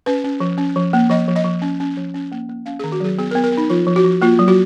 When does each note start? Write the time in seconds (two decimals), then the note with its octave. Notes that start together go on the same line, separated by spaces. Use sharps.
0.06 C#4 B4
0.24 C#4
0.40 F3
0.58 C#4
0.76 F3
0.93 A#3
1.10 F3 D#5
1.28 F3
1.36 D#5
1.45 F3
1.62 C#4
1.80 C#4
1.97 F3
2.14 C#4
2.32 A#3
2.49 A#3
2.66 C#4 F5
2.79 G#4
2.84 D#3
2.92 F#4
3.00 F#3 G#4
3.18 B3 G#4
3.31 A#4
3.35 B3
3.44 A#4
3.52 B3
3.57 D#4
3.70 F3 F4
3.87 F3
3.96 F#4
4.04 F3
4.22 A#3 F4
4.39 F#3
4.48 F#4